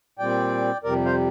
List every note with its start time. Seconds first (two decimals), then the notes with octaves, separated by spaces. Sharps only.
0.19 A#2 G3 C4 D5 G5
0.84 F2 C3 G3 A#4 D5
1.05 C5 F5